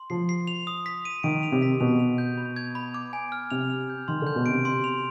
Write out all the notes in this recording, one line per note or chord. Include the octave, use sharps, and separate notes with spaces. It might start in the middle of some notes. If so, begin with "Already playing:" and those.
Already playing: C6
F3 C7
C7
F7
D#6
B6
D#7
D#3 D7
F7
C3
B6
B2 F7
F7
G6
B5
G#6
B5
D6
G#5
F6
C3 F7
F7
G6
D#3 C6
D3 G6
B2
C3 D7
C6
F7